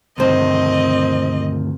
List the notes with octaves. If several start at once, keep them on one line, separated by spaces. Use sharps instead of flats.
D2 G2 C3 D#3 C4 C5 D#5